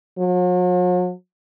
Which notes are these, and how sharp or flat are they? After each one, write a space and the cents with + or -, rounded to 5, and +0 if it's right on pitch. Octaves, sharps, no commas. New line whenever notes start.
F#3 -45